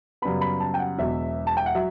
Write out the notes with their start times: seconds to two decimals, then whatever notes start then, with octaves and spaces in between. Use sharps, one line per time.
0.22 F#2 C#3 G3 B3 B5
0.41 B5
0.60 A5
0.74 G5
0.79 F#5
0.98 E1 E2 B2 F#3 E5
1.47 A5
1.57 G5
1.66 F#5
1.75 F#3 E5